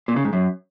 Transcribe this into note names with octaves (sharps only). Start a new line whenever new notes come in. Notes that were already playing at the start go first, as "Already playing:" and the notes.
A#2
C#3
G#2
F#2